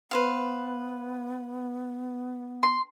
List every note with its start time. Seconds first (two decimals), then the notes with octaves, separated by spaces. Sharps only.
0.11 B3 B4 C5 F5
2.63 C6